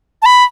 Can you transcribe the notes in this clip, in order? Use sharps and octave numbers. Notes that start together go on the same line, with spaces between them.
A5
B5